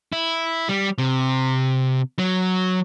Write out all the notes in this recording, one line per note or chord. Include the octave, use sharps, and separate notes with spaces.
E4
G3
C3
F#3